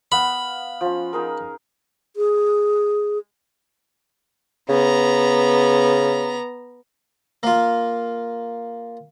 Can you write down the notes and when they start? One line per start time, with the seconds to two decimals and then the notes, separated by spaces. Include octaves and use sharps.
0.12 B3 F5 B5
0.81 F3 C#4
1.13 D#4 G#4 A#4
2.16 G#4
4.69 C#3 B3 A#5
7.43 A#3 F4